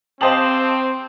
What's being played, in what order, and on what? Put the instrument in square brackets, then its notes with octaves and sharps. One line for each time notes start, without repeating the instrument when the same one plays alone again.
[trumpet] C4 [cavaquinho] G4 D#5 F5 [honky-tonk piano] C5 A5 F#7